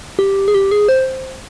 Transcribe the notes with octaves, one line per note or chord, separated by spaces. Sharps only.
G4
G#4
G4
G#4
C5